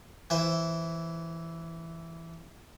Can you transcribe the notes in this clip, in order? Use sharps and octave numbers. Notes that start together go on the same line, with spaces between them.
E3 C5 E5